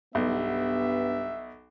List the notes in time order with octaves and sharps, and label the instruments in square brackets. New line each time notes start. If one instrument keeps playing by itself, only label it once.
[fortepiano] B1 [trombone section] G2 B3 [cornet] E5